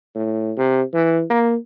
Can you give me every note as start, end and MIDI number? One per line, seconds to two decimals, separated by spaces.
0.15 0.52 45
0.57 0.81 48
0.94 1.23 52
1.30 1.56 58